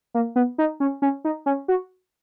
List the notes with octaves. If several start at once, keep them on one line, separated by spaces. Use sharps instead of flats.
A#3
B3
D#4
C#4
C#4
D#4
C#4
F#4